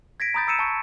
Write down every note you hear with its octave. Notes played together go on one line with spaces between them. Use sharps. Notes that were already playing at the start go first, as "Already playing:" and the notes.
G#6 A#6 B6 D7
A#5 B5 D#6 G6 A6
A#5 D#6 E6 C#7 D#7 E7
A5 C#6